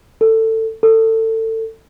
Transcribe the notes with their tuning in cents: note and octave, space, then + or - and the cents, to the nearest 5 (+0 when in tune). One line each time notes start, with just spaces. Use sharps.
A4 +20
A4 +25